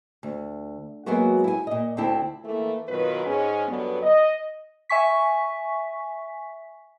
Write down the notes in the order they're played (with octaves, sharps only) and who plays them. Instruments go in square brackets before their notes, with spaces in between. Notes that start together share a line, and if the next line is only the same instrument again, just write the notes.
[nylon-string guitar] D2
F#3 G#3 A#3 B3 F#4
E4 G#5
A#2 D#5
D2 C4 E4 A5
[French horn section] E3 A3 A#3
B2 D#3 F#3 F4 B4
G#2 G#3 C#4
F#2 D3 F#3 G3 B3
D#5
[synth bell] E5 G#5 C#6 B6